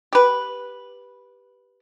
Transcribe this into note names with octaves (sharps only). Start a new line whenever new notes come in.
G4 B4